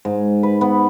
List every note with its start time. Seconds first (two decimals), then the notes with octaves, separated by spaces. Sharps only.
0.05 G#2
0.43 B4
0.61 B3